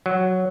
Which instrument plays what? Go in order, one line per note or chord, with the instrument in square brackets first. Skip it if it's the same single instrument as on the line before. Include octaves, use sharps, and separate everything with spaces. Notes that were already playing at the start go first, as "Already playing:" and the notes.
[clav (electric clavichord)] F#3